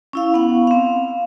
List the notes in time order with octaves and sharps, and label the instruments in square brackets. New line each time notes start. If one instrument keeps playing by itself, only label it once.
[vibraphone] C#4 E4 F5
B3 F#5
C4 F5